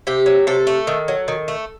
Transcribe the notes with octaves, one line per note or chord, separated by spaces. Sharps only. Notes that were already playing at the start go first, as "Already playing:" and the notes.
C3 G4
F#3
C3 A4
A3
D#3
F#3
D#3
A3